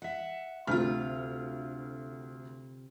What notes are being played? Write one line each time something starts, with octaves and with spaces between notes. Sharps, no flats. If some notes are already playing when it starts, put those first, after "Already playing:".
E5 F#5
D2 C3 F4 F6